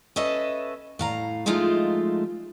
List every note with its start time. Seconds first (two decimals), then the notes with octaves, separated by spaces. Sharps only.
0.16 C#4 A4 B4 D#5 E5
0.99 A2 F5 A#5
1.46 F3 G#3 A3 D#4 F4